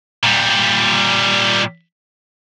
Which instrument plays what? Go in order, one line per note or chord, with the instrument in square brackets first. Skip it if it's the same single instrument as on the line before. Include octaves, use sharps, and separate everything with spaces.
[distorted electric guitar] A#2 G3